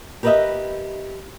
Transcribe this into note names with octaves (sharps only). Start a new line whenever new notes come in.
G4 A#4 B4 C#5 D#5 E5